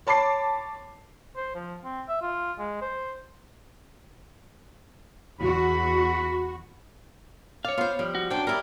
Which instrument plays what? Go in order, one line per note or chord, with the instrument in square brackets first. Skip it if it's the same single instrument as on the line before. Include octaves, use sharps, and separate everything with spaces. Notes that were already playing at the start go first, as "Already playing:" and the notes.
[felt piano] C#5 A5 B5 D6 C7
[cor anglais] C5
F3
C4
E5
F4
G#3
C5
[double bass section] E2 [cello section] F#4 [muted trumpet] B5
[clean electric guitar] C#5 F5 [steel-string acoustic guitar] D5
[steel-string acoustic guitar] B3 C5 [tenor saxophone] F4
[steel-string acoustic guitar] F3 [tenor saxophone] G3
[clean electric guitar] F#4
[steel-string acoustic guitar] F#2 C5 G5 [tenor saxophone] D4
[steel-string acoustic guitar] G3 E4 D5 [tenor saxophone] A#4